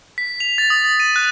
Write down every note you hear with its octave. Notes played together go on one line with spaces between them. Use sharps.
B6
F7
A6
D#6
A6
D#7
F#6